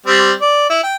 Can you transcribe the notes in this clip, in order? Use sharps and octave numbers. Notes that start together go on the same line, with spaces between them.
G3 C4
D5
E4
G5